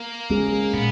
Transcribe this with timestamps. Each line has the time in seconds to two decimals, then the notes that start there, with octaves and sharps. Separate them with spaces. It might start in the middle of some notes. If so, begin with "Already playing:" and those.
Already playing: A#3
0.30 G#3 C#4 G#4
0.73 A#2 B3